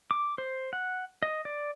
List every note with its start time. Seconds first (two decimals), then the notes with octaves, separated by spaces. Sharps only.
0.11 D6
0.38 C5
0.73 F#5
1.23 D#5
1.45 D5